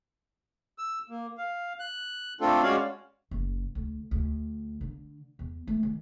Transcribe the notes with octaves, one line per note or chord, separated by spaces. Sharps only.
E6
A#3
F5
F#6
A3 C4 D4 F4 A4
G#3 C#4 F#4 C#5 D5 F5
F#1
D2
D2
D3
E2
A3
D#3